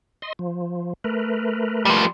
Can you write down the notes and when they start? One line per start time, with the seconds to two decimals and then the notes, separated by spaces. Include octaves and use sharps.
0.22 D#5 C6
0.39 F3
1.04 A3 A#4 B4
1.85 F3 G3